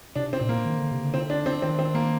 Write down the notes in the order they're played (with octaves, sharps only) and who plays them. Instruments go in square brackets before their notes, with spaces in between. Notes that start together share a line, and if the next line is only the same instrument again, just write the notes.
[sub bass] C3 [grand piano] D4
[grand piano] C4
[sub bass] A#2
[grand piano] A#3
[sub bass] D#3
D3
C3
D3
[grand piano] C4
D4
C4
[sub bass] D#3 [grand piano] C4
[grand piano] C4
A#3